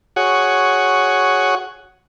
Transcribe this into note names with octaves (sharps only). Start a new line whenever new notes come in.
F#4 G#4 C#5 F#5